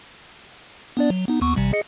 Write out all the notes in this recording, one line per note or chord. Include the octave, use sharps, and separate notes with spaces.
B3 D4 D5
F#3
B3 D#4
D#2 B3 C#6
A1 C3 G3
G#4 D#5 C#7